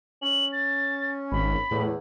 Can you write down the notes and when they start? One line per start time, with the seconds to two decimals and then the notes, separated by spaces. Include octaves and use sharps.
0.22 C#4 F#7
0.52 A6
1.32 G#1 B5
1.71 E2 A2